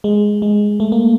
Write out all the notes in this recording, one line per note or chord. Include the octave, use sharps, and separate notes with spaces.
G#3
G#3
A3
A#3